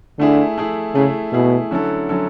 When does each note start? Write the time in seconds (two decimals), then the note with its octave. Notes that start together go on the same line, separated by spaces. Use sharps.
0.19 D3 A3 E4 G#4
0.58 A3 E4 G#4
0.95 C#3 A3 E4 G#4
1.33 B2 A3 E4 G#4
1.71 D3 F#3 C#4 E4 A4
2.09 D3 F#3 C#4 E4 A4